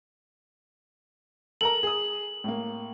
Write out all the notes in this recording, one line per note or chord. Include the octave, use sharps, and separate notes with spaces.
A4 A#4 A#5 F#7
G#4 D#6
A2 A#3